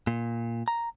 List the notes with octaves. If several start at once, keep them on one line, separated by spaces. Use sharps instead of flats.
A#2
A#5